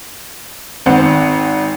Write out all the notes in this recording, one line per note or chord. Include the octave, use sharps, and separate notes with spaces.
G#1 C4 F#5